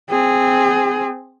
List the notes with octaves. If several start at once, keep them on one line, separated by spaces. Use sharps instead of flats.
C4 G#4